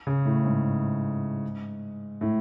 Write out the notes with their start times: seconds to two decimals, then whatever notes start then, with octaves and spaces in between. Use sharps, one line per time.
0.07 C#3
0.25 A2
0.45 G#2
2.21 A2